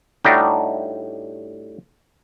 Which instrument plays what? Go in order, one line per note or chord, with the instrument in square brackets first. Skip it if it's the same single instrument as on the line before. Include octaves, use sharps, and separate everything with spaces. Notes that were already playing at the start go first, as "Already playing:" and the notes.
[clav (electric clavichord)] A2 G3 D4 D#4 F#4 G4